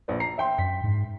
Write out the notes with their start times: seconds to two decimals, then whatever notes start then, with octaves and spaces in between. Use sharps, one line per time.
0.08 A#1 B4 D5
0.20 A#5 C7
0.38 E5 G5 C6
0.58 F#2 B6
0.84 G#2